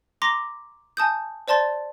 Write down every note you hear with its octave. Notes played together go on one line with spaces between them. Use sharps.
A#5 C6 D6 A#6
G#5 A5 D#6 G6
C5 D5 A5 C6 A6